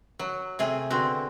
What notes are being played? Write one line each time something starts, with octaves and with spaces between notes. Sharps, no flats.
F#3
C3 A3 G#4
B2 D3 C4 F#4